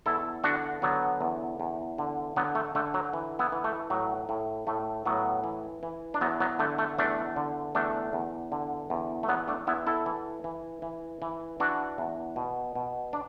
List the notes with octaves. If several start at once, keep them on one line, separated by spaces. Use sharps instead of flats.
E2 E4 A4
D3 D4 F#4
D3 F#3 B3
E2
E2
D3
D3 F#3 B3
A3
D3 A3
F#3
E3
B3 E4
E3
A3
A2 F#3
A2
A2 A3
A2 F#3 B3
E3
E3
D4
E2 F#3 B3
F#3 B3
D3 A3
A3
E2 A3 D4
D3
E2 A3 D4
E2
D3
E2
A3
E2 F#3 B3
A3 D4
E2 B3 E4
E4 A4
E3
E3
E3
E3
E3 D4 F#4
E2
B2
B2
D4